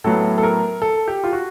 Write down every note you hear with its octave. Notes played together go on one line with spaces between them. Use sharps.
A2 F#3 B3 A4
A4
A#4
A4
G4
F4
F#4